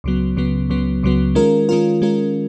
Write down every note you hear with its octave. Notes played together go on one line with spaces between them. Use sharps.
C#2 C#3 F#3 B3
C#2 C#3 F#3 B3
C#2 C#3 F#3 B3
C#2 C#3 F#3 B3
D#3 G#3 C#4 F4 A#4
D#3 G#3 C#4 F4 A#4
D#3 G#3 C#4 F4 A#4